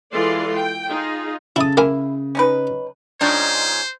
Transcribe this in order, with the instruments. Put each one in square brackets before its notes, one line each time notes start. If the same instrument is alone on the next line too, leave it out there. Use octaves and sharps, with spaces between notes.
[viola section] E3 G#3 F4 A4 D5 C6
G5
D#4 F4 G#4
[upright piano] C#3 [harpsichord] E4 D#6 [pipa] A4
[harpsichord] A#3 A#4 G#5 [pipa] E4
[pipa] C#4 D#4 B4
[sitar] G#2 F4 C#5 [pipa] D4 D#4 G5 [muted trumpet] C5